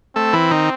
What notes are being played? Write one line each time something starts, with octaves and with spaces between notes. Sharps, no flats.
A3 C4 A4
E3 E4
D#3 D#4